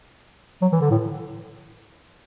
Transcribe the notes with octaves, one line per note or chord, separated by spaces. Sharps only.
F#3
E3
D3
A2